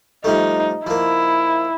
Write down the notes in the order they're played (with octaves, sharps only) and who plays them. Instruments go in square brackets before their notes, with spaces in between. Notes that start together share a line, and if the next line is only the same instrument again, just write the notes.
[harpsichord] F3 G3 A3 [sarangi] D#4
[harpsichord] F3 A#3 [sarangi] E4